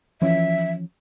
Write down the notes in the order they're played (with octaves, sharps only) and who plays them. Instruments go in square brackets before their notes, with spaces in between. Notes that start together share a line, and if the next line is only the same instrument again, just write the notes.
[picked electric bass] E3 F3 C#4 [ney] E5